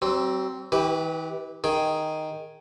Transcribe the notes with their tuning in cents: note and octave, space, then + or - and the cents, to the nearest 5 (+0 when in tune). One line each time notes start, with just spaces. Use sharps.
F#3 +40 C4 +0
E3 -45 G4 -10 B4 +0
D#3 +0 G#4 +0 G5 +0